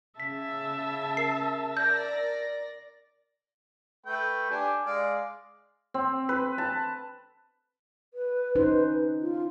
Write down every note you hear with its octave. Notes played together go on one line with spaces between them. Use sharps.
C#3 E5 A5 B6
A#4 C7
D5 G6 A#6
A3 B4 G5
D4 G4 G#5
G#3 D5 F5
C4
B4
A5
B4
C#4 D#4 C5
F4